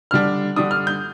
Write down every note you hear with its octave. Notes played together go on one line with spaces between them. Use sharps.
D3 G3 D4 F6
D3 G3 D4 D#6
F6
G6